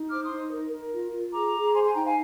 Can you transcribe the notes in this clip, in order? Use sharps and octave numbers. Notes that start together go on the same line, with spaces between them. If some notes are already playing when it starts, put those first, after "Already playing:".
Already playing: D#4
C5 D6 F6
C6 D#6
D#4
A#4
A#4
F4
F4
G#4 A#5 D6
G#4
C5 G#5 C6
G#5 C6
D#4 G5 A#5
F5 G#5